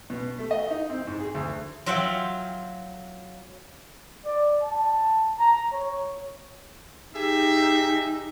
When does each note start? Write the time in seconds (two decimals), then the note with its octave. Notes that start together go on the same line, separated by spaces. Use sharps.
0.10 B2
0.39 A3
0.51 D#5
0.71 D#4
0.90 C4
1.07 G#2
1.20 G#4
1.35 D2
1.86 F#3 F4 E5 F#5 G5
4.25 D5
4.62 A5
5.39 A#5
5.72 C#5
7.15 D#4 G4 G#4 E5